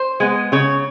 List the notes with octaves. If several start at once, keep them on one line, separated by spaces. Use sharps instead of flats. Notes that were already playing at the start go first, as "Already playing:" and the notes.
Already playing: C5
G#3 B3
C#3 C#5